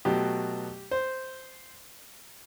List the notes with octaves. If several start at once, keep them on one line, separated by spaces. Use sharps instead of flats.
B2 F#3 A3 G4
C5